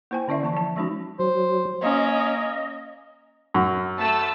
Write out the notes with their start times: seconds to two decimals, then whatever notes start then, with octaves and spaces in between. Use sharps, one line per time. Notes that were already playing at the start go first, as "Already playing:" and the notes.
0.11 A#3 E4 C5 G5 G#5
0.28 D3 C#4 E4 D5 E5
0.42 E3 A#3 A5 C#6
0.53 F3 A5
0.76 F3 G#3 C#4 D#4 F#4
1.19 F#3 C5
1.83 A#3 C#4 D#5
3.54 F#2
3.99 A3 A5 E6